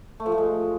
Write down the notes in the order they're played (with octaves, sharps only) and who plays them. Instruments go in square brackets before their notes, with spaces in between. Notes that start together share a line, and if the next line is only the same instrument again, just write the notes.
[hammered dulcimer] A3
F3
A3
G#3